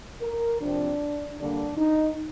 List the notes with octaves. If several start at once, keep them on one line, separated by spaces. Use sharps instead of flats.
A#4
C3 F3 C4 D4
D3 G3 A#3 D4
D#4